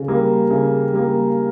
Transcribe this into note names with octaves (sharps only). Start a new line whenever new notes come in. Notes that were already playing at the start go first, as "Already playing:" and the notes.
Already playing: C#3
G3 A#3
C#3
G3 A#3